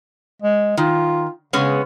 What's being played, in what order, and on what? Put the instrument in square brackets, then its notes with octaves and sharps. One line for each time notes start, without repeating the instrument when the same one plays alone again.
[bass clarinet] G#3
[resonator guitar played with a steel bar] D#3 [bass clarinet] F4
[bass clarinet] C#3 [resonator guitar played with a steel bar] G#3 B3 C#4